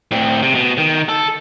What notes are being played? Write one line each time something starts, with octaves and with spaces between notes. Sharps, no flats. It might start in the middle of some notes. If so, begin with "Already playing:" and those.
A2 C4
C3
B2
D#3
A4